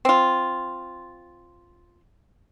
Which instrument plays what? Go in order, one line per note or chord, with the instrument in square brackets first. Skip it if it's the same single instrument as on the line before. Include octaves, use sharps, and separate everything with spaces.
[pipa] C4 F4